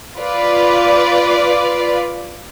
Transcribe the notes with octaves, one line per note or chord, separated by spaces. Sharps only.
F4 B4 D5